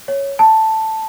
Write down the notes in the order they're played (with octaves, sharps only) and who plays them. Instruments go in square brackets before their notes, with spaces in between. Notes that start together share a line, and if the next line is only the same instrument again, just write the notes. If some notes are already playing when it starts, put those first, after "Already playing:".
[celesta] C#5
A5